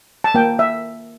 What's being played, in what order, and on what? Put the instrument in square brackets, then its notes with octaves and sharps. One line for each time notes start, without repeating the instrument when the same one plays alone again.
[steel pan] A5
A#3 G5
E5